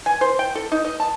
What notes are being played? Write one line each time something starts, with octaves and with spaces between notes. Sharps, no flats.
G#5
C5
G5
A4
D#4
D#5
A5